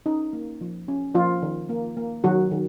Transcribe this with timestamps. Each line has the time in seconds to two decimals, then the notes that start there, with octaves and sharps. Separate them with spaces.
0.06 C#4 D#4
0.33 A#3
0.61 F3
0.88 C#4
1.15 F3 A#3 F4
1.42 D#3
1.69 A#3
1.97 A#3
2.24 D#3 F#3 F#4
2.51 D#3